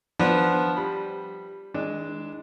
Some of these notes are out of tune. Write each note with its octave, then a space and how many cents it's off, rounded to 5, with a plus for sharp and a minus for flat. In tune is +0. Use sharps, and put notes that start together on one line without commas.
F3 +0 B3 +0 D4 +0
G3 +0 B5 +0
E3 -45 G#3 +0 D4 +0